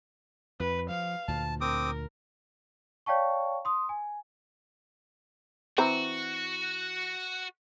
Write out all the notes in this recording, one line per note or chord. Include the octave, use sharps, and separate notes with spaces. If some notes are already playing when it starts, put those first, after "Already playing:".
F2 B4
F3 F5
D2 A#2 A5
C4 A#4 D6 D#6
C#5 D5 F5 G5 A5 C#6
C6 D#6
G#5
E3 C4 F#4 A#5